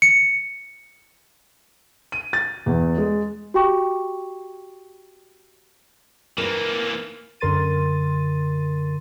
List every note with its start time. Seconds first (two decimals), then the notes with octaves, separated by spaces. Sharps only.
0.02 C#7
2.12 D#7
2.33 A6
2.66 E2
2.98 G#3
3.54 F#4 G4 G5 C#6 D6
6.38 E3 A#3 A#4 B4
7.40 F#2 D3 A#4 C6 A6 D#7